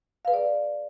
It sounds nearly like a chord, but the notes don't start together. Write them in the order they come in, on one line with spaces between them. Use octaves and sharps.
F5 B4 G#4 D5